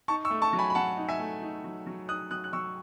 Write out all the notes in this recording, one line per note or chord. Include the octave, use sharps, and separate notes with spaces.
D#4 A5 C#6
C#6 E6
A3
A5 C#6
F#3
G#5 B5
B5
F#3 F#5 A5
D#4
E5 G#5
A3
D#4
F#3
F#3
D#4 D#6 F#6
F#3 D#6 F#6
F#6
F#3 C#6 E6